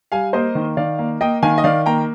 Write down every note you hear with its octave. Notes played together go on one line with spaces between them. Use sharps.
G3 F5 G#5
A#3 C5 D#5
D#3
D#3 D5 F5
A#3
A#3 D#5 G5
D#3 F5 G#5
D#5
D#3 D5 F5
A#3 G5 A#5